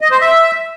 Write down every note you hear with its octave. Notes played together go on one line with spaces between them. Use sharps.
D#5
C5
E5